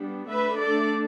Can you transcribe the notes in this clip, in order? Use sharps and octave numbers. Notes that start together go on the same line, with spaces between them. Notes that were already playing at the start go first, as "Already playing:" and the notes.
Already playing: G3 B3 D4
D3 A3 D4 B4 E5
A4 D5